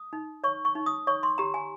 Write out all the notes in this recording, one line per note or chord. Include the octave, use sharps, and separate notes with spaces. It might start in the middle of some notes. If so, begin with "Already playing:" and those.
Already playing: D#6
D#4
C#5 C#6
C#6
D#4
D#6
C#5 C#6
C6
G4 A#5
G#5